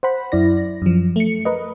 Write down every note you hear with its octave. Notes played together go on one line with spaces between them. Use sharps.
C5 F#5 B5
F#2 E4 D5 A#6
F#2 F3
A3 C#7
A#4 B4 D#5